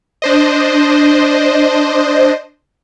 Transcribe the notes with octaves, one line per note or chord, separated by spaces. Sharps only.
D4 C5 D#5